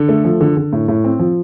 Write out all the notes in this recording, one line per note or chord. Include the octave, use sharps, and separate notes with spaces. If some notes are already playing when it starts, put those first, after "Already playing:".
Already playing: D3
A3
F3
D3
D3
A2
A2
C4
F3